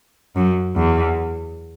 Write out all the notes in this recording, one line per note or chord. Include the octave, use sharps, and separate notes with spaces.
F#2
E2